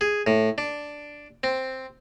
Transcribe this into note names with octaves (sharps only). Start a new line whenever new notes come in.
G#4
A2
D4
C4